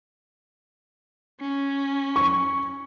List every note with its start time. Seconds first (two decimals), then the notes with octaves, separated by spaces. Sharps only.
1.40 C#4
2.16 C#6